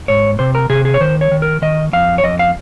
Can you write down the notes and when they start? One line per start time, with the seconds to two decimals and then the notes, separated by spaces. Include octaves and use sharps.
0.08 G#2 C#5
0.39 C3 C5
0.55 A#4
0.70 C3 G#4
0.85 G#4
0.94 C#5
1.01 D#3 C5
1.21 C#5
1.32 D#3
1.42 A#4
1.62 D#3 D#5
1.93 F2 F5
2.18 C#5
2.24 F2 D#5
2.39 F5